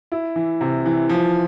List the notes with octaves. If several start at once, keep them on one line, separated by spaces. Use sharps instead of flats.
E4
E3
C3
E3
F3